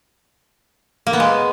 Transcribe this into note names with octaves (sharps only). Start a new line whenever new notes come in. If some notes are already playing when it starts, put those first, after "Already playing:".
A#3
B3
G#3